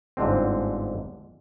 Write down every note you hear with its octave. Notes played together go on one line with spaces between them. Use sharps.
G1 G#2 D3 C4